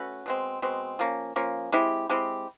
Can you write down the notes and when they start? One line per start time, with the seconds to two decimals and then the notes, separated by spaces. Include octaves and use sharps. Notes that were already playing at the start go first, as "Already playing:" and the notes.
Already playing: A3 C#4 F#4 B4
0.26 B2 G#3 C4
0.62 B2 G#3 C4
0.99 F3 A#3 C#4
1.36 F3 A#3 C#4
1.72 G#3 C4 E4 G4
2.09 G#3 C4 E4 G4